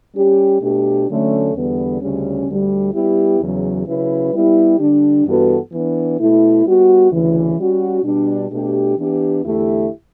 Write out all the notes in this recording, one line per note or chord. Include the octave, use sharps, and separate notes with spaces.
G3 C#4 G4
B2 A3 D4 G4
D3 F#3 A3 C#4
E2 D3 G3 B3
D2 C#3 G3 C#4
D2 D3 G3
G3 B3 E4 G4
E2 C#3 F#3
C#3 F#3 C#4 E4 B4
G3 B3 E4 G4
D3 G3 D4
G2 E3 B3 F#4 A4
E3 B3 D4
B2 A3 E4
G3 B3 F#4
D2 C#3 E3
G3 C#4 F#4
B2 G3 D4
B2 A3 D4 G4
E3 B3 D4 G4
E2 D3 A3 E4 G4